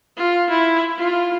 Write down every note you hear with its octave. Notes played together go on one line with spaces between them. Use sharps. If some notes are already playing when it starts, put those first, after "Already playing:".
F4
E4
F4